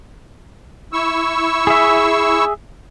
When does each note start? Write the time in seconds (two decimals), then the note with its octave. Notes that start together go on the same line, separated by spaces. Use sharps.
0.93 E4 C#6 E6
1.67 G#4 E5